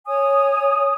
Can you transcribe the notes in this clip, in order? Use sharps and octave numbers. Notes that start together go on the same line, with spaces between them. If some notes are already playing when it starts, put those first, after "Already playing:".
C#5 G#5 D#6